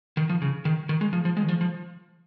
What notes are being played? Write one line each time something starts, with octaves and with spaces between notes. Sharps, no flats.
D#3
F3
C#3
D#3
D#3
G#3
F3
F3
G#3
D#3
F3
F3